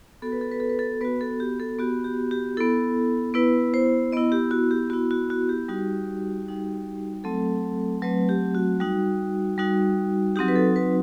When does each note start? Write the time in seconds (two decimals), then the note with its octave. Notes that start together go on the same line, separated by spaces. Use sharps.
0.22 B3 F#4 A4
0.32 B4
0.41 A4
0.51 B4
0.60 A4
0.69 B4
0.79 A4
1.01 B3 F#4 B4
1.21 A4
1.40 G4
1.60 A4
1.79 B3 F#4 G4
2.04 G4
2.31 G4
2.57 B3 E4 A4
3.34 B3 E4 B4
3.74 C5
4.12 B3 E4 D#5
4.32 G4
4.51 F#4
4.71 G4
4.90 B3 E4 F#4
5.11 F#4
5.30 F#4
5.49 G4
5.68 G3 D#4 F#4
6.46 G3 D#4 F#4
7.24 F#3 A3 C4 A4
8.02 F#3 A3 C4 B4
8.29 G4
8.55 F#4
8.80 G3 D#4 F#4
9.58 G3 D#4 F#4
10.36 F#3 C4 D#4 F#4 G4
10.48 B4
10.56 A4
10.76 B4